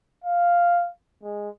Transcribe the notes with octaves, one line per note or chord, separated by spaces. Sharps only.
F5
G#3